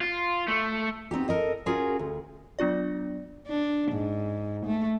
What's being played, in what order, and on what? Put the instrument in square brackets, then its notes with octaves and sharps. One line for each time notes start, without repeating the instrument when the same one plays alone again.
[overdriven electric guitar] F4
A3
[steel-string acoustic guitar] B3 C4 D#4 G4
A4 A#4 D#5
C#4 F4 F#4 G#4 A#4
D2
[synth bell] F#3 B3 D4 F4 D5
[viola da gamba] D4
G#2
A3